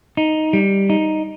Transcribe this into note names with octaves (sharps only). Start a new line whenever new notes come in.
D#4
G3
D#4